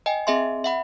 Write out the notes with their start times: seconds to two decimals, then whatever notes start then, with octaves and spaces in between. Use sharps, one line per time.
0.06 D#5 G5 G#5
0.27 C4 G#4 D#5 E5 G#5 C6
0.64 E5 F#5 B5